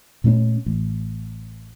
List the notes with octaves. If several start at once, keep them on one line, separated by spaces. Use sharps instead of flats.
A#2 A3 C4 C#4
A1